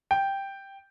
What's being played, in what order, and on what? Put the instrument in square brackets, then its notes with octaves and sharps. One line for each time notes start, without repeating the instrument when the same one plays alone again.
[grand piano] G5